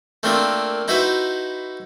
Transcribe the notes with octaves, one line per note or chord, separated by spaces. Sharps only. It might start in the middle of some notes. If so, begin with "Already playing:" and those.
A3 A#3 C4 D4 F4 A#4
D#4 E4 F#4 B4 C5 E5